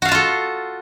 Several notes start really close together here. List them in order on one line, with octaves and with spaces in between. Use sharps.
F#4 F5 A5 F4 A4